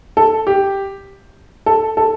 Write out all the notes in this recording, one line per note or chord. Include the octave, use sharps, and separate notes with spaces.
A4
G4
A4
A4